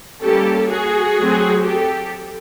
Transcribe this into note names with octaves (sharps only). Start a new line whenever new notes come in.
G3 A#3 C#4 G4 A4
F#4 G#4
F#3 A3 C4
G4 A4